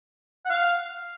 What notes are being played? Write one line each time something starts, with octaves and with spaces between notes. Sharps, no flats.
F#5
F5